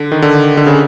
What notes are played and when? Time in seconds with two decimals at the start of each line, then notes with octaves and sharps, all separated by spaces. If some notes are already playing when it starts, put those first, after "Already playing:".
Already playing: D3
0.12 D#3
0.22 D3
0.57 D3
0.66 C#3